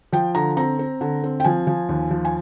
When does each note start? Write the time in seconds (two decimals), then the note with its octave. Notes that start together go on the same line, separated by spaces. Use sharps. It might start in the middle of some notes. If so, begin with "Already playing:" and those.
0.13 F3 G5
0.35 D3 A#5
0.57 C4 A#5
0.79 C4
1.01 D3
1.24 C4
1.40 G5
1.44 F3 G#5
1.67 F3
1.89 D#2
2.11 F3
2.25 G#5